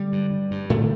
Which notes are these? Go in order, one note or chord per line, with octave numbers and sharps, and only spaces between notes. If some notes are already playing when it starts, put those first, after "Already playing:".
Already playing: D3 G3
G2
G2
G2
A2 D3 A3